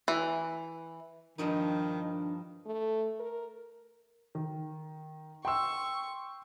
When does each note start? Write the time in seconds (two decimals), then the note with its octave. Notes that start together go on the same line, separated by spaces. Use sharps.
0.08 E3
1.38 G2 D#3 F3 D4 D#4
2.66 A3
3.20 A#4
4.35 D#3
5.45 G5 C6 C#6 E6